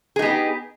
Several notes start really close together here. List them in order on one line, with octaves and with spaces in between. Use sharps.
G#4 D#4 B3 G4